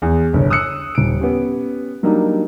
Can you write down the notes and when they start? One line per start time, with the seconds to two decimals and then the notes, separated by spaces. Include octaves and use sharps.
0.02 E2
0.33 G1 C2 C#5
0.50 D#6 E6 F#6 C#7
0.95 D#1 D7
1.19 B3 C#4 G4
2.03 F#3 G3 A#3 D4 D#4